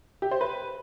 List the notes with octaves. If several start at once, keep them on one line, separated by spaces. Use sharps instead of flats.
G4
C5
B4